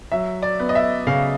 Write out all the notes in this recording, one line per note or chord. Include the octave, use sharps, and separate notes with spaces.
F#3 E5
D5
B3
D#5
E5
C#3 F5